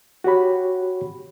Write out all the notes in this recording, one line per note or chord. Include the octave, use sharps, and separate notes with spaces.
F#4 G4 C#5 B5